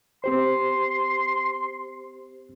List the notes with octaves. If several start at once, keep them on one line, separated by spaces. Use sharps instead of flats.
C4 G4 C5 C6